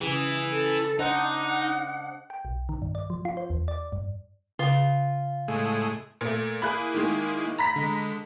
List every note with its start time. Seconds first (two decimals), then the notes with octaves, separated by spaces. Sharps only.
0.01 C#3 E3 G#4
0.52 A4
0.99 D4 D#4 C5 D#5 F#5
2.30 G5
2.45 B1
2.69 D#3
2.82 G2
2.95 D5
3.10 F3
3.25 F4
3.37 C5
3.50 E2
3.68 D5
3.92 G2
4.59 C#3 F4
5.48 A2 G#3
6.21 A#2 A3
6.62 A#3 E4 G#4 B5 F#6
6.94 D#3 G#3
7.58 A#5 B5 B6
7.76 D3 G#3